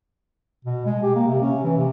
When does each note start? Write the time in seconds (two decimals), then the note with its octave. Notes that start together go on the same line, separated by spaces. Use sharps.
0.65 B2
0.86 G#3
1.03 G4
1.15 A#3
1.27 C3
1.42 C#4
1.63 E3
1.77 C3